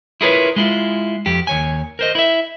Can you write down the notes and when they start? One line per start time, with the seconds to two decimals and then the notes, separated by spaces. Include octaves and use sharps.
0.21 E4 F4 G#4 A#4 B4 C#5
0.56 G#3 E4 F4
1.26 F2 G4
1.47 D#2 C#5 G#5
1.99 A#4 C5 D#5
2.15 E4 E5